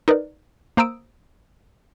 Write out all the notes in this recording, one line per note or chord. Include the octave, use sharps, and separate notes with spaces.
D#4 A#4 B4 D5
A#3 C5 A#5 D#6 E6 D7